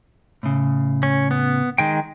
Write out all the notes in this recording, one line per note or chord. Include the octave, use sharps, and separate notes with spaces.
A2 C#3
C#4
B3
D#3 G#3 G5